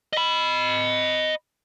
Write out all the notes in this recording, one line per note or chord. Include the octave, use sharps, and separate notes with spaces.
D#5 B5